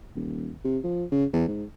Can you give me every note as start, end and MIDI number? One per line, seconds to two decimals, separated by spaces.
0.15 0.50 27
0.65 0.78 48
0.84 1.05 53
1.12 1.25 49
1.33 1.46 40
1.48 1.64 44